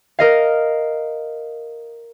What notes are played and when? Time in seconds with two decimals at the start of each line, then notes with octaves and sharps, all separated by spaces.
0.19 A#4 D#5 F5